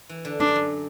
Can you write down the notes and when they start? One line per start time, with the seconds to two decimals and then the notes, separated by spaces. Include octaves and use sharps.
0.09 E3
0.25 D3
0.40 F#2 D4
0.48 G2
0.55 F#2